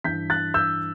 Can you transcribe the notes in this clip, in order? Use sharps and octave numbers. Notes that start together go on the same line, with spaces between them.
G2 E3 G6 B6
F#6 A6
E6 G6